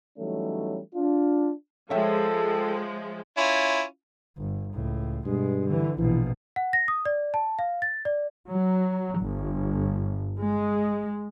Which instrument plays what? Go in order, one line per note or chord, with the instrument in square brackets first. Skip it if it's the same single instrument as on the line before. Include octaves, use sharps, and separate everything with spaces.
[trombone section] E3 F#3 G3 A3 C#4 D#4
D4 F4
[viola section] F3 G#3 [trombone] A4 [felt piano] C#5 E5 G5
[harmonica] C#4 E4 F4
[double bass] G1
C#2 A2
[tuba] G2 [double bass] B2 G#3
[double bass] D3 E3
[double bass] A#1 B2 [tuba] E3
[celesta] F#5
A#6
D#6
D5
A5
F5
A6
D5
[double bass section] F#3
G1
G#3